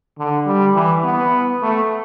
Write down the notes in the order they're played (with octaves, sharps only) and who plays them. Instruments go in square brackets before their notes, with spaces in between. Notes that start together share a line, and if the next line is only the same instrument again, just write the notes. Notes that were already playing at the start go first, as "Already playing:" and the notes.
[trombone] D3
G3
E3
B3
A3